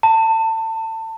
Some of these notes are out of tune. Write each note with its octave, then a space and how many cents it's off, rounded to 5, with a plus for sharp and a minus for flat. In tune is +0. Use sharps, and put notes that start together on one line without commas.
A5 +25